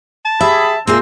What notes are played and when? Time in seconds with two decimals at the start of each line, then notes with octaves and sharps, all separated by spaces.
0.25 A5
0.41 G4 G#4 E5 B5
0.87 A#2 A#3 C4 G#4 E5